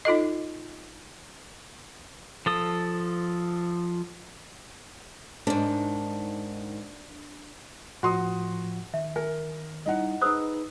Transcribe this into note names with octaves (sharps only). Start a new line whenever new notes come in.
D#4 F4 A4 D#5
F3 A4 D#6
G#2 D#3 D4
A2 F3 F#4 C6 D#6
D#3 E5
A#4 G#5
G3 D#4 E4 D#5 F#5
D#4 G#4 B4 C5 D#6 E6